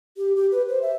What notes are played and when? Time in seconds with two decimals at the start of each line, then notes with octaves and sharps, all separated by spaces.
0.17 G4
0.36 G4
0.52 B4
0.69 C5
0.82 E5